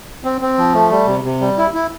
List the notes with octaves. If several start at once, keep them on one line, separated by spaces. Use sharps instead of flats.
C4
C4
F3
A3
G3
C3
C3
G3
E4
E4